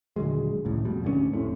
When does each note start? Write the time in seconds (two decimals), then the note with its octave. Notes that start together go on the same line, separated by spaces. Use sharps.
0.16 D#1 D3 F#3 G#3
0.65 G#1 C#2 A2
0.85 F2 B2 G3
1.04 D2 G#2 G#3 C#4
1.33 F1 A2 C3